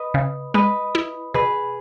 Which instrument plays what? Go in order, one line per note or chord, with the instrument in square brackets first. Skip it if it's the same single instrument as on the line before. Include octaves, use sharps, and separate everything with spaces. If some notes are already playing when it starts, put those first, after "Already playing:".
Already playing: [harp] B4 D#5
[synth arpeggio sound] C#3
[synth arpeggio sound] G#3 [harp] B4 D#5
[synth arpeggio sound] E4
[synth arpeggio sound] B2 [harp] G#4 B4